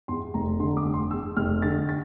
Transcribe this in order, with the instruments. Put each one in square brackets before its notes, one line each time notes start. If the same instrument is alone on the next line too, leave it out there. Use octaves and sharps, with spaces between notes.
[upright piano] E2 C6
F1 A#5
D3 C6
D6
F1
C6
E2 E6
F1 F6
D3 A6
A6